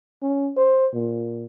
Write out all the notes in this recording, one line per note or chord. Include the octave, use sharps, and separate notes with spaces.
C#4
C5
A#2